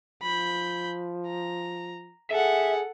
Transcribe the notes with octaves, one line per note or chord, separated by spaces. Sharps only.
F3 B5 G6
A#5
G#4 A4 E5 F#5